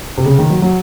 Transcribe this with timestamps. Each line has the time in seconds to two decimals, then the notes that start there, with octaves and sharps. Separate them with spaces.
0.18 C3
0.26 C#3
0.39 D#3
0.50 F#3
0.62 F#3